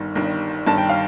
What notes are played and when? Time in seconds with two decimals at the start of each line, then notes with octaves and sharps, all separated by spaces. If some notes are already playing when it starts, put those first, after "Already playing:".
Already playing: G1 G2 D#3
0.15 G1 G2 D#3
0.67 G1 G2 D#3 A5
0.78 G5
0.90 F5